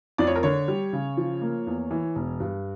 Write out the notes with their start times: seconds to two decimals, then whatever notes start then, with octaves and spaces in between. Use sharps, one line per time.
0.18 F2 D5
0.27 C#5
0.36 A#4
0.43 D3 C#5
0.68 G3
0.93 C#3
1.17 F3
1.42 A#3
1.67 E2
1.91 E3
2.15 E1
2.40 G2